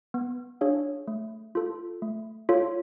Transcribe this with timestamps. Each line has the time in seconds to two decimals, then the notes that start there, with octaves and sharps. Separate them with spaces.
0.14 B3
0.61 D4 G#4 C#5 F5
1.07 A3
1.55 F4 A4
2.02 A3
2.49 F4 A4 C#5 F5